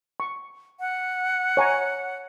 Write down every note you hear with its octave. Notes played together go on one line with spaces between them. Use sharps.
C#6
F#5
C#5 G#5 A#5